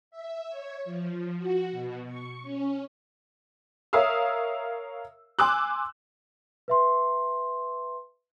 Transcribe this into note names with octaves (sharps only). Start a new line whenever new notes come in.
E5
C#5
F3
F#4
B2
C#6
C#4
A#4 C#5 E5 F5 D#6 E6
G#5 C6 D6 E6 F#6
B4 E5 C6